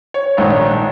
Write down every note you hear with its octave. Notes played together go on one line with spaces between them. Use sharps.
C#5
A#1 G#2 D#3 C#5